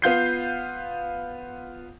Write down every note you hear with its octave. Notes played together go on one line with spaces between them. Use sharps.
B3 F4 G6 C7